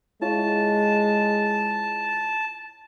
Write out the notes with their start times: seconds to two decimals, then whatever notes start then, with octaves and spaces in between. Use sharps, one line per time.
0.22 G#3 E4 F4 C#5 A5